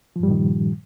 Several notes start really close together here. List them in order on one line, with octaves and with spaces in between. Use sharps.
F3 G2 G3 A#2 D#3